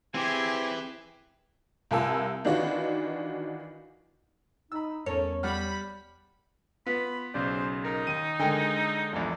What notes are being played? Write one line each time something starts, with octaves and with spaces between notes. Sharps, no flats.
E3 C4 E4 G4 G#4 G#6
C2 F4 A#4 G#5 A5 E6
D#3 E3 D4 F4 F#4
D#4 B5 E6
E2 C#4 A4 A#4 C#5
G3 F#5 B5 F6
B3 F4 B5
B1 C#3 C5 D5
D#4 A#4
D#2 D#7
D3 G#3 A#4 G5 G#5
A#1 E2